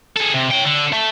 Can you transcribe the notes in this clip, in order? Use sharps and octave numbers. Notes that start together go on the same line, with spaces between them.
G#4 A4
C3
C#5 G5
D3
A3